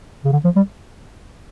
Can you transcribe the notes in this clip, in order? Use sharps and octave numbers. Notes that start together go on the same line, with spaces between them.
C#3
D3
F3
G3